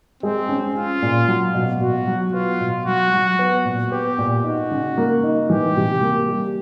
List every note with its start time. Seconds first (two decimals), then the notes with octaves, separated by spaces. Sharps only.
0.23 G#3 C4
0.49 C#4
0.75 C#4 F4
1.02 A#2
1.28 F#3
1.54 B2
1.81 B2 F#4
2.07 F#3
2.33 B3 F4
2.61 B2
2.86 F#3 F#4
3.13 F#3
3.39 B3
3.65 A#2
3.92 B3 G4
4.18 A#2
4.44 D#4 F#4
4.71 C#3
4.98 A#3
5.23 D#4
5.50 E3 G4
5.77 C3
6.02 A#3
6.29 G3